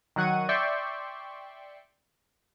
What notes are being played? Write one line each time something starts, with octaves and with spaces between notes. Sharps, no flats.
D#3 F#3 F#5 C#6 D#7
D5 E5 G5 C6 C#6